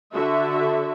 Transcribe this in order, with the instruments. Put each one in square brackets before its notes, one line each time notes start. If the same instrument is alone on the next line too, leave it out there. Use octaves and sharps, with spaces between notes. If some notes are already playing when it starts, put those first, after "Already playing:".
[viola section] D3 F#4 E5